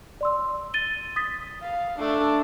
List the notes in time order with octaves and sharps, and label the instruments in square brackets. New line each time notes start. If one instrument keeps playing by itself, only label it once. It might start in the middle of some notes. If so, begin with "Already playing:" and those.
[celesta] D5 C6 E6
A6 D#7 G7
D#6 A6 B6
[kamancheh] F5
A3 D4